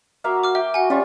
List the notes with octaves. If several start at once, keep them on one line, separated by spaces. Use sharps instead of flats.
A#3 F#4 E5 F5
D6 F6
E5 G5
F#4 F#5 G#5
G3 C#4 F4 C#6